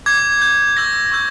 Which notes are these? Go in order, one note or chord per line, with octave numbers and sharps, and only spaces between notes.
D6 G6 G#6
D6 G6
C#6 E6 G6 A#6
C#6 E6 G6